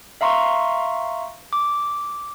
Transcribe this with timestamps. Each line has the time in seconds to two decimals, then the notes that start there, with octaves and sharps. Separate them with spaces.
0.21 E5 F5 A#5 C6 C#6
1.53 D6